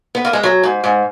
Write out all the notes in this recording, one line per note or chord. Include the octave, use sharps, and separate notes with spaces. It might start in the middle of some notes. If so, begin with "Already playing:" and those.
B3
A#3
G#3
F#3
G#2
G#2